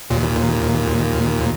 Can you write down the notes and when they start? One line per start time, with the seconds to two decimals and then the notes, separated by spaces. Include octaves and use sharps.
0.10 D#2 A#2